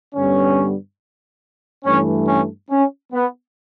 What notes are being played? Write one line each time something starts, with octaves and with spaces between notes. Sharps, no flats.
G2 D3 G3 B3 C#4
G2 E3 A3 C#4
C#4
C#4
B3